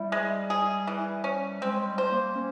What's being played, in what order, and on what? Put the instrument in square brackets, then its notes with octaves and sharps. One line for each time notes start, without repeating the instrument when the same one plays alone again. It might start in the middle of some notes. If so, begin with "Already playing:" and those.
Already playing: [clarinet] G3 [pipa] E4
[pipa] G#3
G#4
E3
C#4
[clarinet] G#3 [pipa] C4
[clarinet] G3
[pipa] C5
[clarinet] A#3
C#4